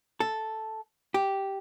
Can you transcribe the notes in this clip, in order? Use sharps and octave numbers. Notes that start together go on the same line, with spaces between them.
A4
G4